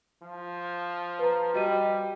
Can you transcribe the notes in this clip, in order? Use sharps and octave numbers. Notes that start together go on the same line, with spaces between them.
F3
B4 A#5
G3 F#4 D#5 D#7